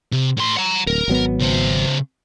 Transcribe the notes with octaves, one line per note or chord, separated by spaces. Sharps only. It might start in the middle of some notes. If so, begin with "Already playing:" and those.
C3
A2 C6
F#5 A#5
D1 A#4
G#1 F#3 B3
C#3 C5